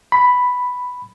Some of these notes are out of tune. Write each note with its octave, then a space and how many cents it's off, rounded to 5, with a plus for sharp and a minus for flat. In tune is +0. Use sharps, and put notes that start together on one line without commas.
B5 +5